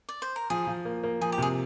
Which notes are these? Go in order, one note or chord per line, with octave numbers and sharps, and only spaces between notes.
D5
C5
A#4
F3 G#4
F3
A#3
A#3
F3 G#4
G4
C3 G#4